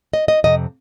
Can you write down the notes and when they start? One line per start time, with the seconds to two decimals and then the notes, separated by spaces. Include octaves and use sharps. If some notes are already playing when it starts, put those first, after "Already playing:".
0.13 D#5
0.28 D#5
0.44 F2 C3 D#5